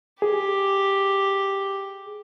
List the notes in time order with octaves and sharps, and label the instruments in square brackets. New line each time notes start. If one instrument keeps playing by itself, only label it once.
[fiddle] G4 [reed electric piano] G#4